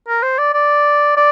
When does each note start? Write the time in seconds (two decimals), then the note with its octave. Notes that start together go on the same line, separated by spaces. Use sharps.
0.08 A#4
0.23 C5
0.38 D5
0.54 D5
1.17 D5